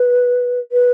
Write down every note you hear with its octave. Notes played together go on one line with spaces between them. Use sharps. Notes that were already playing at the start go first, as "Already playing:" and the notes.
Already playing: B4
B4